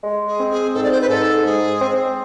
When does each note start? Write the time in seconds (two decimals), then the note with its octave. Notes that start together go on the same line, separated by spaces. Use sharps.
0.04 G#3
0.27 G#4
0.39 C4
0.51 G#4
0.75 G#2 A4
0.83 D5
0.92 C5
1.01 B4
1.10 G#2 A4
1.45 G#3 G#4
1.80 C4